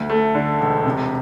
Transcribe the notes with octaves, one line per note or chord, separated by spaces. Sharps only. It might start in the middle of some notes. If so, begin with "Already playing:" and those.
Already playing: D2
A3
D3
E1
C3